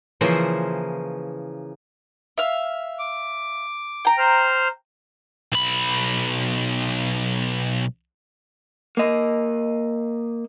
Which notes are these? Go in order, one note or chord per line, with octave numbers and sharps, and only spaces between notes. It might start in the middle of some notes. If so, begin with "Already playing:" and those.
C#3 E3 F3 A#3 C#4 C5
E5 F5
D6
G5 A#5
C5 F6
B1 B5
A#3 D#5